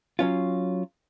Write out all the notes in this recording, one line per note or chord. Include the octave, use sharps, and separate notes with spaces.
F#3 C#4 F4